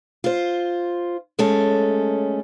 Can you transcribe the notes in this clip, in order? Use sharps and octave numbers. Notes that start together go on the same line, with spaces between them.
F4 C5
F#2 G#3 A3 C#4 A4 A5